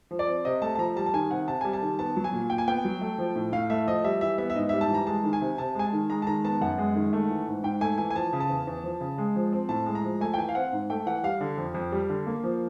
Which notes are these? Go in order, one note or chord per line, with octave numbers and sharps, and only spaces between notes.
F3
D5
C4
C3 D#5
A3 A5
A5
F3 A#5
G3 A5
A5
D#3 G#5
C3 F#5
C3 A5
G3 G#5
A5
D#3
B3 A5
F#3
G#5
A#2
A#2 G5
G#5
B3 G5
F#3
A3
F3
A2
A2 F5
A3 E5
F3 D#5
G3 E5
E3 E5
B3 E5
E5
G#2 D#5
G3 E5
A5
E3 A#5
G#3 A5
D#3
G#5
C3
C3 A5
G#3 G#5
A5
D#3
G#3 A#5
A5
D#3 A#5
B3 A5
F#2 F#5
G#3
D#3
A3
E3
G#2
G#2 G5
A3 G#5
E3 G#5
G#5
F3 A5
C#3
A5
E2
E2
F3
C#3
G#3
F3
C4
A2 A5
G#3
A#5
F3
A3 G#5
G5
E3 G#5
F5
C4 F#5
G#2
A3 G5
E3 F#5
G3 F5
D3
F2
F2
G3
D3
A#3
F3